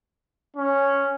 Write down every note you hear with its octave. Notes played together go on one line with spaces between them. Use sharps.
C#4